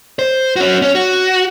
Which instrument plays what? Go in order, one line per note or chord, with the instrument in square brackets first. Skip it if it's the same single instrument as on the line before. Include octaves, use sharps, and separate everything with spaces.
[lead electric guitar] C5
C#4 F#4
C#4
F#4